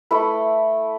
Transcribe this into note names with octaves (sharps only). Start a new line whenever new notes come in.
A3 E4 B4